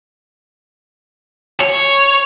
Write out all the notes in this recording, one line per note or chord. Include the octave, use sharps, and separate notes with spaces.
C#5